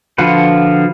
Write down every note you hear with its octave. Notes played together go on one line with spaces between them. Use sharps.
D3 F3 F4 F#4 B4